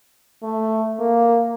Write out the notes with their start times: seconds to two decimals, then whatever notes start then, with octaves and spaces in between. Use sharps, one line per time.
0.43 A3
0.99 A#3